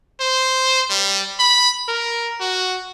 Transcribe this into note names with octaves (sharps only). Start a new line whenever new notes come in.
C5
G3
B5
A#4
F#4